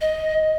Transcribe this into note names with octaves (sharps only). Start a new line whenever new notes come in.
D#5